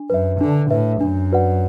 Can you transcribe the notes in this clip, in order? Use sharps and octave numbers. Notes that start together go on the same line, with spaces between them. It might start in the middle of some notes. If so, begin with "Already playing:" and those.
Already playing: D4
F#2 B4 E5
D3 D4
A2 B4 E5
F#2 D4
F#4 B4 D5 F#5